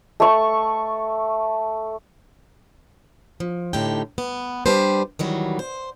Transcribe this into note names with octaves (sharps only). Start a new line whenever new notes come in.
A3 C#6
F3
A2 D3 D#4 G4 G5
B3
G3 D4 G4 B4 C5
D#3 E3 F#3 G3
C5